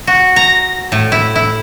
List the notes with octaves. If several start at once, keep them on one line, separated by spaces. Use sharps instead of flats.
F#4
A#5
A2
E4
E4